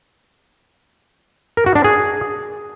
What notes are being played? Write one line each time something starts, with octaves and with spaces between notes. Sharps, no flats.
A#4
F#4
D4
G#4